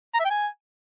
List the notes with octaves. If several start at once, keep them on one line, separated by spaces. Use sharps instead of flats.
A#5
E5
G5
G#5